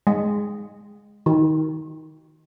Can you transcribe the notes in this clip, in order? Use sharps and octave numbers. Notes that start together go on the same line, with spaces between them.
G#3
D#3